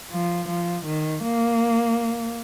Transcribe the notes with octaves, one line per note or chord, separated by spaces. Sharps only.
F3
F3
D#3
A#3